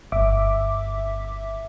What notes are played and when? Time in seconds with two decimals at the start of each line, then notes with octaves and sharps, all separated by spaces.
0.12 G1 E5 D6